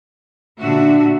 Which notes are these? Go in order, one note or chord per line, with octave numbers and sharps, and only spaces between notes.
A#2 D3 D4 F#4 E5